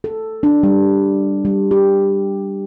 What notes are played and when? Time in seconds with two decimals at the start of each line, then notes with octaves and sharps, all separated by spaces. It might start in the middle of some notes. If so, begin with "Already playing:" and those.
0.04 A4
0.43 D4
0.63 G3
1.45 G3
1.71 G4